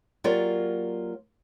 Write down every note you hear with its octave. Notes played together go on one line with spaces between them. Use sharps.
F#3 A#3 F4 G4 A#4 D5